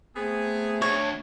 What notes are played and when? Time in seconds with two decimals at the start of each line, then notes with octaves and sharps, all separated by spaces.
0.16 A3 B3 C4 G#4
0.82 D2 C#5